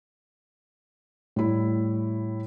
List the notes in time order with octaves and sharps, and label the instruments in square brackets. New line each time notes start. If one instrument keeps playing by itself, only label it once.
[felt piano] A2 G3 E4